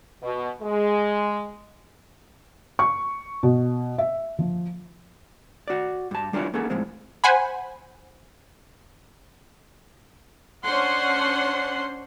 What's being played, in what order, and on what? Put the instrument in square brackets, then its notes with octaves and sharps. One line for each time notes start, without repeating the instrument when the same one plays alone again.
[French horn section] B2
G#3
[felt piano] C#6
B2
E5
F3
[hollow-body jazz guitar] F#4 D5
G2 A5
G3 D4 E4 F4 C#5
A#3 B3 C#4 D#4 G#4 A4
A2 F3 G#3 C4
[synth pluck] C5 F#5 G#5 B5
[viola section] C#4 D4 C5 F#5 C6